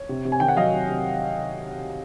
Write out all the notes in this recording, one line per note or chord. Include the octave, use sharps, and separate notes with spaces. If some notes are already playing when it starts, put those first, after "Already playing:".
Already playing: C#5
C3
C3
G#5
D#3 G5
F#5
F#3 D#5 F5
C3
C3